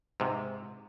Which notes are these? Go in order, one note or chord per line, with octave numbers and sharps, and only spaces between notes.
G#2 C3